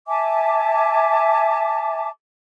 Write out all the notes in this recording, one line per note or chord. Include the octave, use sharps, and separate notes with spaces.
E5 G#5 A5 D6